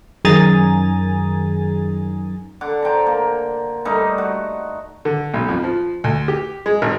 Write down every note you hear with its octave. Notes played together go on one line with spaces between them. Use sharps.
F#2 D#3 G#4 G#5 A#5 A6
D3 F#5 D6
C5 G5 A5 A#5
A#3
G2 G3 A3 D#4
F#4
D3
B1
F2
F3
D2
G4
G#3
G#1